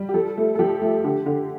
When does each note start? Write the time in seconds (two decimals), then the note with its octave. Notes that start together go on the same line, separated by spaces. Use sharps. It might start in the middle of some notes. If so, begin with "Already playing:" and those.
Already playing: G3
0.09 G4
0.14 F3 A4
0.37 A3
0.55 A4
0.59 F3 G4
0.82 A3
1.04 D3 G4
1.26 D3